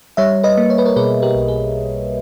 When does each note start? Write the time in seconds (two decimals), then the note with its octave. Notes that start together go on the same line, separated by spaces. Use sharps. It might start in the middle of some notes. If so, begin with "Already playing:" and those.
0.17 G3 C#5 E5
0.43 B4 D#5
0.57 A#3
0.70 C#5
0.78 B4
0.86 A#4 C#5
0.96 B2 G#4 B4
1.22 G4 A#4
1.35 B1
1.48 G#4